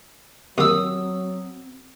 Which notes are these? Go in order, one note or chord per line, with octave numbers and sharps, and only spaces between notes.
D#2 F#3 C4 D#6 E6